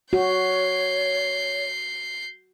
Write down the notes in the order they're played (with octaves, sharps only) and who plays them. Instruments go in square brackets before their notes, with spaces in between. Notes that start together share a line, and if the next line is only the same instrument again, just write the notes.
[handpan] F#4 [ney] C#5 [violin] G6 C7